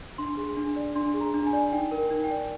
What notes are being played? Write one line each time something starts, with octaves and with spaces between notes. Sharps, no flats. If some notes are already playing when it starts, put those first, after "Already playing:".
D4 C6
G#4
D4
D5
D4 C6
G#4
A#5
D4
G#5
D5
D#4 G5
A#4
G5
D#4
G5
D5